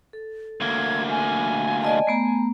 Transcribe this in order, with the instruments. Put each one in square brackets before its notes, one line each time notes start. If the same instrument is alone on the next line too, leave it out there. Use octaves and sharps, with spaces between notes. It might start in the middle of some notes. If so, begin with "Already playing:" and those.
[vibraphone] A4
[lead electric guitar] D2 A#3 [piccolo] G#6
[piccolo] G#5
[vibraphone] D5 D#5 A5
A3 B3 A#5